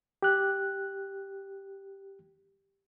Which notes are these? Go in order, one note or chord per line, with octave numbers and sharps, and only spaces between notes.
G4 F#6